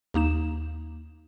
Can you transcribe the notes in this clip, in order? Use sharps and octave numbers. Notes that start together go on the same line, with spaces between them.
D#2 A#3 D#4 E7